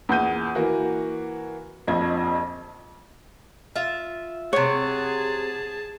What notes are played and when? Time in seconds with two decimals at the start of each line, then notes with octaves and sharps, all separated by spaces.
0.09 E2 A#2 G6 D#7
0.55 E3 A#3 F#4
1.87 A#1 F2 F3 D#5 G#6
3.76 F4 E5
4.53 C3 G#4 C#5 F#5 A5